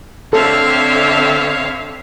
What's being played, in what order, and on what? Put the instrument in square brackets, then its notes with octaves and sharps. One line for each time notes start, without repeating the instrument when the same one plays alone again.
[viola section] D3 C4 E5 [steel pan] A4 [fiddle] C#5 F5